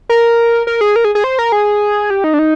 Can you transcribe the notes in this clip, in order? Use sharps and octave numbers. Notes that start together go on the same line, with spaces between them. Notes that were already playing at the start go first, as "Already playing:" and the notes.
A#4
A#4
G#4
A#4
G#4
G#4
C5
A#4
G#4
G4
D#4
D4
D#4